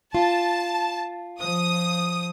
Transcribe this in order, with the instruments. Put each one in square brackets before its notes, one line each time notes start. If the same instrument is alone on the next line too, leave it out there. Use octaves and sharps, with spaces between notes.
[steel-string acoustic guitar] F4 [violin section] A5
[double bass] F3 [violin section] D#6